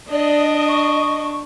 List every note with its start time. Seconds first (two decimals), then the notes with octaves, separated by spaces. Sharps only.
0.11 D4 D5 D#5
0.67 C#6